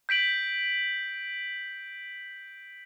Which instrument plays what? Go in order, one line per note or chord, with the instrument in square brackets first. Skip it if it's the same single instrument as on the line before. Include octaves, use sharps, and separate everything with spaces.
[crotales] G6 B6 D7 F#7